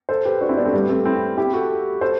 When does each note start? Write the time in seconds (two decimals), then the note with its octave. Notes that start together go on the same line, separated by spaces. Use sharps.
0.09 A4 C5
0.25 G4 B4
0.41 D4 F#4
0.49 C4 E4
0.57 B3 D4
0.65 A3 C4
0.73 G3 B3
0.89 A3 C4
1.05 C4 E4
1.38 E4 G4
1.53 F#4 A4
2.01 A4 C5